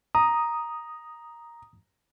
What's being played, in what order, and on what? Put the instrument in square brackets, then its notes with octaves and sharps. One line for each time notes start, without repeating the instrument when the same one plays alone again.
[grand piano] A#5 [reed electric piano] D#6